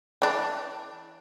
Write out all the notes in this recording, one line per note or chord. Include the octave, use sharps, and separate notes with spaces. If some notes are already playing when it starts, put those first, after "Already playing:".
E3 D4